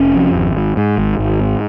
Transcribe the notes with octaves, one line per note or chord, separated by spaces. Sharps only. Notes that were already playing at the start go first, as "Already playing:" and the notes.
Already playing: F1 C#4
F2
G#1
G#2
G#2
G#1
G#1
G#2